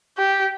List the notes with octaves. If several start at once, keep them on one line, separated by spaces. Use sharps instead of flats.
G4